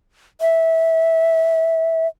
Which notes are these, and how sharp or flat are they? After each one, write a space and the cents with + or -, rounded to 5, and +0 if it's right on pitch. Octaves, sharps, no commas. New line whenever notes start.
E5 -15